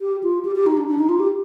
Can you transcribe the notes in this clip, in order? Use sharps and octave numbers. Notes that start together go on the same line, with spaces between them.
G4
F4
G4
G4
D#4
D4
D4
D#4
F4
G4